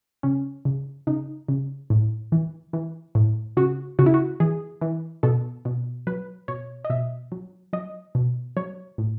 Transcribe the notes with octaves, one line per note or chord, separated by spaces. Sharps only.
C#3 C#4
C#3
C#3 D#4
C#3
A2
E3
E3
A2
C#3 F#4
C#3 F#4
E4
F#4
E3 G#4
E3
B2 A4
B2
F#3 B4
B2 C#5
D#5
B2 E5
F#3
F#3 D#5
B2
F#3 C#5
A2